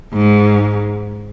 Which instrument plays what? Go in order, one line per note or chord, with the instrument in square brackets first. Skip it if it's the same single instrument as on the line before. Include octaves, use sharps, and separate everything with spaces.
[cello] G#2